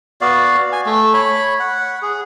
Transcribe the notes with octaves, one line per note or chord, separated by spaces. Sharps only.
B3 F#4 D5 F5
G#5
A3
C#5 B5
F#5
G#4